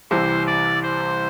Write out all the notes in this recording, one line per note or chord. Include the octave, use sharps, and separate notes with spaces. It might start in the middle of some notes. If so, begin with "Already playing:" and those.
C2 C3 E3 C5
D5
C5